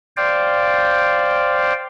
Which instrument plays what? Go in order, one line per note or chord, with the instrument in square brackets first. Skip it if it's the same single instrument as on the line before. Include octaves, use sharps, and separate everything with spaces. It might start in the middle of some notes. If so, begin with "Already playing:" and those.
[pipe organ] C5 D5 F5 G5